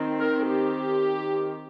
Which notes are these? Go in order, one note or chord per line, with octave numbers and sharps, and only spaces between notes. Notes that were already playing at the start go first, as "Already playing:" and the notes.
Already playing: D#3 C4
A#4
G4